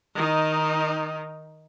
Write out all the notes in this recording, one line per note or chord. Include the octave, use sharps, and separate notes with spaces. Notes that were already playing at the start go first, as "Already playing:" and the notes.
D#3 D#4